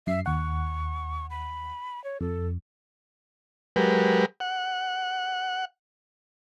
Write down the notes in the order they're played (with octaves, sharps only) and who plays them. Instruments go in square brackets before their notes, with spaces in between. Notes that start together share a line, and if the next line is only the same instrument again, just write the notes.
[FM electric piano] F#2 C7 [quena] E5
[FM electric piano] D#2 F#5 [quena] C#6
[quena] B5
C#5
[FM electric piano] F2 [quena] A4
[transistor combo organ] F#3 G#3 G4 A#4 B4
F#5